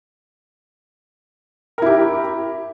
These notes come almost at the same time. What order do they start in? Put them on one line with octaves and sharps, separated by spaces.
A#4 E4 G4